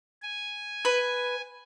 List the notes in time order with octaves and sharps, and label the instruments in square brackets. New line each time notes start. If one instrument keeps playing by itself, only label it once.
[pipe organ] G#5
[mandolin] B4